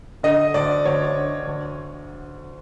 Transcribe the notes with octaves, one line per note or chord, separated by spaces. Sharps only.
D3 D#5
D2 D5
D2 C#5
D3
D2